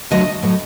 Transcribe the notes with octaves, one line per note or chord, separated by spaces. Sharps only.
D#2 D3 F#3 A3 D#5
A2 F#3 A3